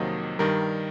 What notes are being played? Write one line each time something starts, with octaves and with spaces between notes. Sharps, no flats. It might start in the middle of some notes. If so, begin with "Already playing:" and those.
Already playing: F2 C3 D#3 F#3 A#3 D#5
G2 D#3 G3 A#4